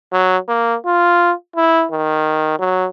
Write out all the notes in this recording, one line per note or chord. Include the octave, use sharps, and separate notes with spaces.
F#3
A#3
F4
E4
D#3
F#3